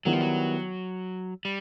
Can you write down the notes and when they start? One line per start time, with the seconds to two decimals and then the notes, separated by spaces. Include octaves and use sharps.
0.05 D#3 F#3 G3 B3 E4
0.13 F3
0.21 F#3
1.45 G3